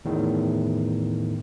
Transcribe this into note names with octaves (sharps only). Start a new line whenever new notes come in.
E2 A2 D#3